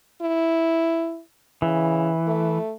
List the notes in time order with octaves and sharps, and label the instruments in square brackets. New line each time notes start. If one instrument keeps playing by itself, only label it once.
[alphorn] E4
[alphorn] C#3 [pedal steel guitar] E3
[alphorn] A3